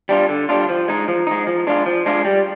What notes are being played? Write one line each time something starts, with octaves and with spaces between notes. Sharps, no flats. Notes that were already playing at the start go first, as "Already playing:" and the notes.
G3 D4 F4
D3
G3 D4 F4
F3
G#3 D#4
F3
G#3 D#4
F3
G#3 D4 F4
F3
G#3 D4 F4
G3